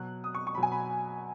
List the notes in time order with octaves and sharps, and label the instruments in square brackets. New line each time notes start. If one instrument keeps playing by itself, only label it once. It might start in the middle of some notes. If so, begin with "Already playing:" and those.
Already playing: [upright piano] B2 F#3 F#6
D#6
C#6
C#6
B2 F#3 B5
G#5
B5